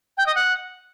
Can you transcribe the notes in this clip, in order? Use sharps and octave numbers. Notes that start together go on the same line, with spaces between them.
G5
D#5
F#5